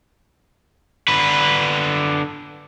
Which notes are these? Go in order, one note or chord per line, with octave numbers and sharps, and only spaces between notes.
D3 B4